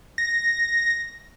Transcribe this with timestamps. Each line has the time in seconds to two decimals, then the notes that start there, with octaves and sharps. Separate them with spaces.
0.18 A#6